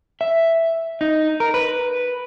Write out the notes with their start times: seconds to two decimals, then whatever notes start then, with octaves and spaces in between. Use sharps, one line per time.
0.21 E5
1.01 D#4
1.40 A#4
1.54 B4